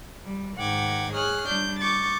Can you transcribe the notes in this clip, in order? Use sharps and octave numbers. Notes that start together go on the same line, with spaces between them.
G3
G#2 D#3 F#5 G5 D6 G#6
G#4 C#5 D#6 F6 F#6
G3 D4 G6
C#6 D6 G6 A6